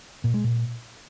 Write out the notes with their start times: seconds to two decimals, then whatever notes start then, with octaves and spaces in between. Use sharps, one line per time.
0.24 A#2
0.34 G#3
0.44 A#2